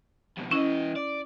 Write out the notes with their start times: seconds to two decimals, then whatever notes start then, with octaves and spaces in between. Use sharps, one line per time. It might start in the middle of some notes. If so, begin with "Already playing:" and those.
0.38 F2 B2
0.51 E3 C#4 E4 D#5
0.96 D5